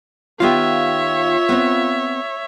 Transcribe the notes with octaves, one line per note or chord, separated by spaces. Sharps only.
D#3 B3 F4 G4 C#5 E5
B3 C4